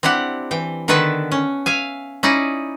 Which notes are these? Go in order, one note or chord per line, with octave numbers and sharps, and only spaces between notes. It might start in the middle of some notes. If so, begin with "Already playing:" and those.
C4 D4 E4 G4 F#5
E3 G5
D3 D#3 B3 B4 E5 A5
C#4
E5 F5 G#5
C#4 D#4 E4 D5 D#5